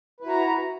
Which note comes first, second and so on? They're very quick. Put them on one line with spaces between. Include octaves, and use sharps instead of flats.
B4 E4 F#4 A#5